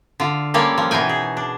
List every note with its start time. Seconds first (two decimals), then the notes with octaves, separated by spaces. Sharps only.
0.20 D3 F4
0.54 G3 G#3 A#3 C#4 A4 C#5
0.78 F3
0.91 B2 E3 D#4 G5 G#5
1.09 G#4
1.37 D4